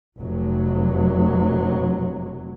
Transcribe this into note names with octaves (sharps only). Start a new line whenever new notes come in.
F1 C3 F#3